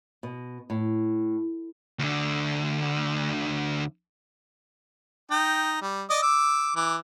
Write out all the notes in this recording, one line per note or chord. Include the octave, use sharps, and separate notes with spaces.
B2
A2
D2 D3
D#4 G5
G3
D5 D#5 D#6
D6 E6
E3 D6